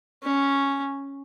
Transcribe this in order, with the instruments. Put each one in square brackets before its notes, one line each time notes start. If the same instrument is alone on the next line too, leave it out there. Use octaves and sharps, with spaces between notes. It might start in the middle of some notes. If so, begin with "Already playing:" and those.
[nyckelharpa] C#4